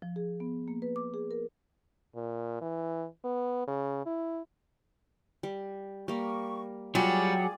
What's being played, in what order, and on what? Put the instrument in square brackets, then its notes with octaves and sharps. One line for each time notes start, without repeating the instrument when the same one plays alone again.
[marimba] F3
G#4
B3
A#3
B4
D6
G#4
A#4
[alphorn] A#2
E3
B3
C#3
E4
[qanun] G3
[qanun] G3 A#3 [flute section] C#6
[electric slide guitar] F#3 F#4 [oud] G3 [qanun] F4 [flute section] G#4 G#5 D6